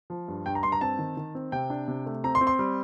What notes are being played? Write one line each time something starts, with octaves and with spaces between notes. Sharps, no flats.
F3
G2
G2 G5
A#5
G2 C6
A#5
C4 A5
D#3
D#3
C4
C3 G5
D4
C3
A3
C4 A#5
C6
C4
C6
G3